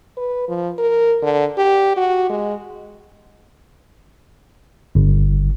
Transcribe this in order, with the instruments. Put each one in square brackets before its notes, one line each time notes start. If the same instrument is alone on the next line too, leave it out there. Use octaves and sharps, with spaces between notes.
[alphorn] B4
F3
A#4
D3
G4
F#4
G#3
[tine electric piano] G1